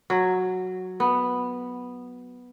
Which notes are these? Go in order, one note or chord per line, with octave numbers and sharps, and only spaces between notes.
F#3
B3